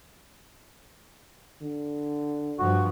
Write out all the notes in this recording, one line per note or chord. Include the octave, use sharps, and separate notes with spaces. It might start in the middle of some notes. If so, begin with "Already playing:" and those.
D3
G2 F3 F#4